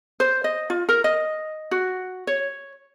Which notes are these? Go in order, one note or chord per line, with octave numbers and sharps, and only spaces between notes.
C5
D#5
F4
A#4
D#5
F#4
C#5